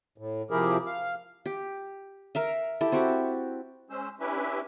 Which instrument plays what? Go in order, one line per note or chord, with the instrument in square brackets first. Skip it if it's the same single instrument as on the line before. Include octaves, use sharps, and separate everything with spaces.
[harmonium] A2
C3 F3 E4 G4 G#4 A#4
F5
[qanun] G4
A#4 E5 F5
E4 G4 A4
C4 F#4 G4 C#6
[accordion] G#3 C#4 C5 E6
C#4 D4 E4 G4 B4 E5